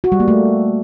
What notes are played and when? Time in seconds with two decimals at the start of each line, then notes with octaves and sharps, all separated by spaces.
0.04 F#4
0.12 G3
0.20 A#3
0.28 A3